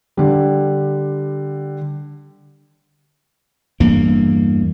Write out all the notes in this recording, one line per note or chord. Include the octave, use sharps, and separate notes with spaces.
D3 G3
E2 G2 A#3